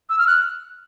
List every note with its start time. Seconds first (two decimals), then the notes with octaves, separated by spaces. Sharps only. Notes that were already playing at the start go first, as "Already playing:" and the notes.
0.09 E6
0.18 F6
0.27 F#6